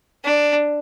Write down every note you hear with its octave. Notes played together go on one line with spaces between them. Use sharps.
D4